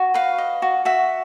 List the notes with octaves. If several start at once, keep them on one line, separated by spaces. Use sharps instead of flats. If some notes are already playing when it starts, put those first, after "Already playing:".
Already playing: F#4
B4 F5
D#5
F#4
F#4 E5